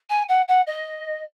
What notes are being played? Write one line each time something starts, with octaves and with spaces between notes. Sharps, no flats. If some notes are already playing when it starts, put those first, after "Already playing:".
G#5
F#5
F#5
D#5